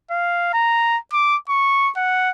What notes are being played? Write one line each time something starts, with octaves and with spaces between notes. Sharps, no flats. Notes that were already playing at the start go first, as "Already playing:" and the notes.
F5
A#5
D6
C#6
F#5